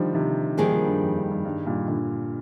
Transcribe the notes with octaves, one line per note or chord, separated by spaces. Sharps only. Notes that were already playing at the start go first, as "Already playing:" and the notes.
Already playing: D3 D#3 F3 G3
C3 D#3
D3 D#3 F3 G3 A#3 D4 G#4
D3 F3
G2
F2
G2
G2
G2
G2 A#2
A#2 D3